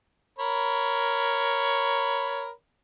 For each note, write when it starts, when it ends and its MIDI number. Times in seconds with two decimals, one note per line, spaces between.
0.39 2.50 70
0.39 2.50 73
0.39 2.50 83